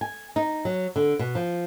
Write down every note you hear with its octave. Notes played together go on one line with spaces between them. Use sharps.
G#5
D#4
F#3
D3
B2
F3